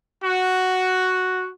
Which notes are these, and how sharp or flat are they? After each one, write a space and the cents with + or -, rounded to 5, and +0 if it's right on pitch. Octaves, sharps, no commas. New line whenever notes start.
F#4 +0